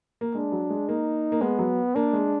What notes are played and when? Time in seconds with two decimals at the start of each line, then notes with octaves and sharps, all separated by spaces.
0.21 A#3
0.35 G#3 D4
0.52 F#3
0.70 G#3
0.88 A#3 D#4
1.32 A#3
1.41 G#3 B3
1.59 F#3
1.95 A#3 D4
2.13 G#3